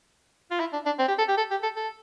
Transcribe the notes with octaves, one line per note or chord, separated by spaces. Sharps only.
F4
E4
D4
D4
C4
G4
A4
G4
A4
G4
A4
A4